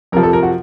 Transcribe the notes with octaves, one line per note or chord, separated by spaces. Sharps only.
F2 C3 F3 A#4
A4
A#4
F#4